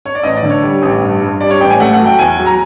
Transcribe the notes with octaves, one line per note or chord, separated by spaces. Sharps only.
C#5
D5
A1 D#5
D5
D3
C#5
G3
A1
G2
G2
G3 D5
C#5
A1 G5
G#5
A3 F#5
F#5
F#3
G5
E2 G#5
F#3
A#5